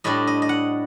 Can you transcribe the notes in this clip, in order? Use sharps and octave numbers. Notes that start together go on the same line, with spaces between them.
A2 G3 D4 D#5
D#5
D#5
F#5